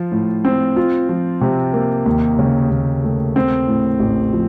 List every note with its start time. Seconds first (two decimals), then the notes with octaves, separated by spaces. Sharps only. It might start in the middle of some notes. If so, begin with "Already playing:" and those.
Already playing: F3 F4
0.12 A2
0.45 C4
0.76 F4
1.09 F3
1.41 C3
1.73 A#3
2.06 D#2
2.39 C#3
2.70 D#2
3.04 A3
3.36 C4
3.68 A2
4.00 A1
4.33 F3